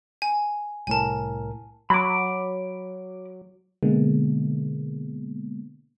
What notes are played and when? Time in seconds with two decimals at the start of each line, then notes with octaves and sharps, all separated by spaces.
0.22 G#5
0.87 C2 A2 A#4 G#5 A5
1.90 F#3 B5 D6
3.83 B2 D3 G#3 A#3 B3